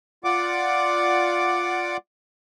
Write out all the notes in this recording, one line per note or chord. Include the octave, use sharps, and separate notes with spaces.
F4 D5 F#5 D6